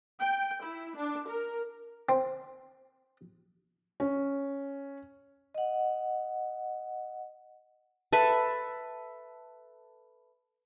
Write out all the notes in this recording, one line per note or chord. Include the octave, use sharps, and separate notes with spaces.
G5
E4
D4
A#4
C4
C#4
D#5 F#5
A4 B4 E5 B5